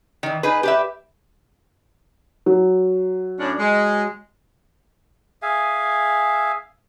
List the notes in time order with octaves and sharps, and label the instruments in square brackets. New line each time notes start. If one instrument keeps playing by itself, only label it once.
[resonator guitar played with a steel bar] D#3 E3
D#4 G#4 B4
G4 B4 E5
[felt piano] F#3
[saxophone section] A2 C#4 D4
G#3
[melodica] G#4 E5 F5 G#5